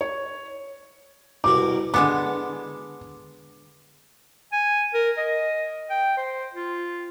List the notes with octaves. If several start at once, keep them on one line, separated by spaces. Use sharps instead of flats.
C#5
C2 B2 F#3 D6
D3 G#3 B3 A4 D6
G#5
A#4
D#5
G5
C5
F4